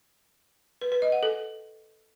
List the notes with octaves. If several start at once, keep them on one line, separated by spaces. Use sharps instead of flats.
B4
B4
D#5
F#5
A4